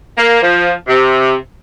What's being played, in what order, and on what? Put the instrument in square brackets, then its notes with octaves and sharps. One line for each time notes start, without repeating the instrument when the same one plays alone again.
[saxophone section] A#3
F3
C3